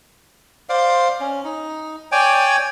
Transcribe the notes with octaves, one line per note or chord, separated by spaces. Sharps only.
C5 D5 F5
C#4
D#4
C#5 D5 G5 G#5